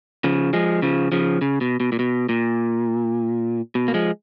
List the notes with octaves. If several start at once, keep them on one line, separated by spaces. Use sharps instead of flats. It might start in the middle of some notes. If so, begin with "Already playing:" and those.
C#3 F3
F3 G#3
C#3 F3
C#3 F3
C#3
B2
B2
A#2
B2
A#2
B2
A#3
F3 G#3